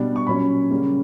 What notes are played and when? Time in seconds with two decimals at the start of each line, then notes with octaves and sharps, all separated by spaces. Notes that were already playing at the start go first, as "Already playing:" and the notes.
Already playing: B2 G3 B3 D4
0.16 C#6
0.27 A#2 F#3 A#3 C#4 B5
0.71 C#3 G3 A#3 C#4